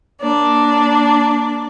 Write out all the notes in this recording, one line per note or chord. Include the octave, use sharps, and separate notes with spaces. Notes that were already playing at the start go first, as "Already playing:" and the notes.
A#3 D4 D5